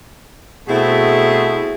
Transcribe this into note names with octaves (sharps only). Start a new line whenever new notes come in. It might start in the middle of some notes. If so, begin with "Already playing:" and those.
B2 A3 C4 E4 G#4